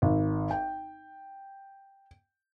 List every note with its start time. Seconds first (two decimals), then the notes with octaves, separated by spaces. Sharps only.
0.02 G#1
0.51 G5